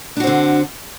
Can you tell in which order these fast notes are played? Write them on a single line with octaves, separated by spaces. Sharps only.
D4 F#4 C4 D3